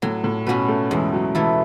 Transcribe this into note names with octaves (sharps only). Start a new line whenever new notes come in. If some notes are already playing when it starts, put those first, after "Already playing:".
A2 F#3
A2
B2 C#4 F#4 B4
A3
E2 G#3
F#3
B2 E3 A3 E4